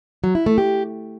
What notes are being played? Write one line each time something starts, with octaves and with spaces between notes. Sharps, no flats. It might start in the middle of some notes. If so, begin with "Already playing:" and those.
F#3
E4
A3
G4